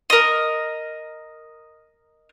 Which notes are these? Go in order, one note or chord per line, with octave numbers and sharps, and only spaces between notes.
A#4 D#5